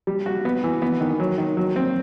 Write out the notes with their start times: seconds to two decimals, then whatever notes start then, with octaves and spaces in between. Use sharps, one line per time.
0.07 G3
0.26 F#4
0.45 B3
0.64 E3
0.82 B3
1.01 D#3
1.20 F#3
1.38 D#3
1.57 F#3
1.76 C4